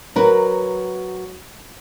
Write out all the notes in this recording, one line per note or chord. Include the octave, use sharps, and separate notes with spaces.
F#3 A#4 B4